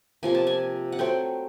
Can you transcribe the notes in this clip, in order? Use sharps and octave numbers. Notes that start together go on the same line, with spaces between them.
C3 F3 A#3 G#5
A5
G#5
F#5
F#3 A3 C4 G5